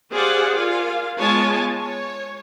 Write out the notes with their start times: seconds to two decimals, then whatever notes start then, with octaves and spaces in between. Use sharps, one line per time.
0.12 G4 G#4 C5 D5 F5 F#5
0.57 F4 A#4 F5 G#5
1.18 G#3 B3 F4 C#5 G#5 A5
1.77 C#5